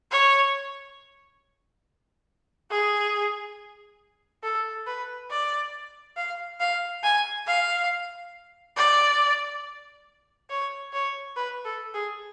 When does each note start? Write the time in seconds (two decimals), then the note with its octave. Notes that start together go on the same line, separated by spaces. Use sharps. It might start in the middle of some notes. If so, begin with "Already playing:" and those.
0.11 C#5
2.71 G#4
4.44 A4
4.87 B4
5.31 D5
6.17 F5
6.60 F5
7.03 G#5
7.47 F5
8.77 D5
10.50 C#5
10.93 C#5
11.37 B4
11.65 A4
11.94 G#4